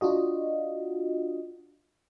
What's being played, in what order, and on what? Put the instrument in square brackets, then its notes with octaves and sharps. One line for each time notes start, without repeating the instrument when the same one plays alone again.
[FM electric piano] D4 F4 F#4 D#5